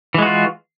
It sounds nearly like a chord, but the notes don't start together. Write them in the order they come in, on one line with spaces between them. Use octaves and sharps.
E3 G#3 F#4 F4